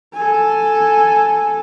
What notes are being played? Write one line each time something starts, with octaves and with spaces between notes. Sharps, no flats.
A4 G#5